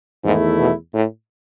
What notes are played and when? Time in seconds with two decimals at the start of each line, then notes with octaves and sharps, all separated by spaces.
0.23 E2 G#2 D#3 A3 E4
0.58 B2
0.93 A2